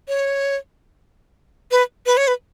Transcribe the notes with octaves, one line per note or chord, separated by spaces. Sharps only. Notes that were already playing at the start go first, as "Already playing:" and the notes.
C#5
B4
B4
C#5
B4